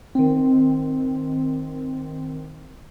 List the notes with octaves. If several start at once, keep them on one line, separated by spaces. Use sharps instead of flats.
D#3 C4